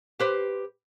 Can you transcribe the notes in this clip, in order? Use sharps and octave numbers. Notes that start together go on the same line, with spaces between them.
G4 B4 C5